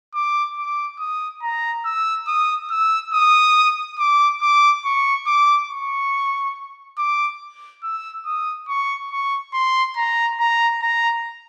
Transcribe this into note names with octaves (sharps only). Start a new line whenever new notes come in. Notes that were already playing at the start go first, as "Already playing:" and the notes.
D6
D6
D#6
A#5
E6
D#6
E6
D#6
D6
D6
C#6
D6
C#6
D6
E6
D#6
C#6
C#6
C6
A#5
A#5
A#5